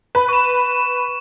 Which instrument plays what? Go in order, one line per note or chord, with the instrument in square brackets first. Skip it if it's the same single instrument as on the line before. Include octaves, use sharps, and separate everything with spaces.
[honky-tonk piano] B4
[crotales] C#6 E7